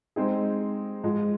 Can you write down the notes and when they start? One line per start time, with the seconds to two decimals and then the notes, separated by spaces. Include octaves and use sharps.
0.16 G#3 C4 D#4 G#4
1.04 G#2 F3 G#3